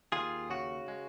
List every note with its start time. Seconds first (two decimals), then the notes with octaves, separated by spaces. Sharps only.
0.12 D#2 F4 G#4
0.50 C#3 F#4
0.88 G#3